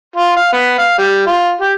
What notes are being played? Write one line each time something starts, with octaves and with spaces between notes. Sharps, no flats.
F4
F5
B3
F5
G3
F4
G4